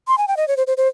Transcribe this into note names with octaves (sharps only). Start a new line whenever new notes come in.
C6
G#5
G5
D#5
C#5
C5
C5
C5